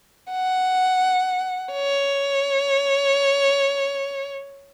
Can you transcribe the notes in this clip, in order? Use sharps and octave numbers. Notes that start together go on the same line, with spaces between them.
F#5
C#5